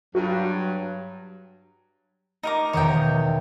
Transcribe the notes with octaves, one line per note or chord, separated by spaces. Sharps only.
G2 F#3 F#4
D#4 A#4 D#5 A#5 D6
E1 E2 D#3 C#5 D#5 G5